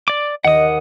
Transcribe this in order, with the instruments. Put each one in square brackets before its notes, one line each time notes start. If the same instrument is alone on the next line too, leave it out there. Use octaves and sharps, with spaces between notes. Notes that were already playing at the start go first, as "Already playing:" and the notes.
[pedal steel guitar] D5 D6
[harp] D#2 [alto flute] D#5 [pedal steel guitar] F#5 D#6